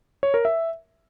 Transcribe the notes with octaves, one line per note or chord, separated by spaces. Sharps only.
C#5
A#4
E5